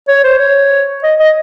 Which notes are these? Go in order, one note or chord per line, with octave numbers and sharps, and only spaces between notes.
C#5
C5
C#5
D#5
D#5